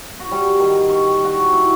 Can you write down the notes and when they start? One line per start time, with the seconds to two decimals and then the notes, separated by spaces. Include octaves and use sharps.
0.19 F#4
0.31 G3
0.60 D#3
0.90 C#6
1.24 F#4
1.53 E4